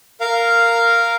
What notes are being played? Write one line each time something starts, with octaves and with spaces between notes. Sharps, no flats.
A#4 F5